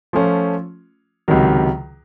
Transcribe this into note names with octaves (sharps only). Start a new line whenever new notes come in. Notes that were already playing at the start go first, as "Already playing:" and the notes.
F3 A3 C#4 F4
C#2 C3 D#3 F#3